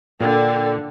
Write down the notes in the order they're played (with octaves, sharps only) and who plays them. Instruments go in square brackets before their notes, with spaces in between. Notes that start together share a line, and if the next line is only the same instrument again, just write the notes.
[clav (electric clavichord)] A#2 [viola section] D3 [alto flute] G5